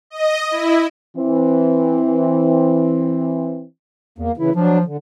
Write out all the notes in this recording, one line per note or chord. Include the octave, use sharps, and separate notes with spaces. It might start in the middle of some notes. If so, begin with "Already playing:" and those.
D#5
E4
E3 C4
E2 A#3
C#3 E3 E4
F3 F#3 D4
D3